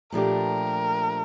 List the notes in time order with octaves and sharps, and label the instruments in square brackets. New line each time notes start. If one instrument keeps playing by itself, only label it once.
[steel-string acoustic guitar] A#2 F3 A3 D4 G4 [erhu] A#4